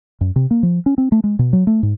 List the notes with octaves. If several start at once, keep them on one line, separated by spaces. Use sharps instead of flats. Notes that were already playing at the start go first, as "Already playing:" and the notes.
F#2
C3
A#3
F3
C#4
C4
A3
G#3
B2
F#3
A3
G#2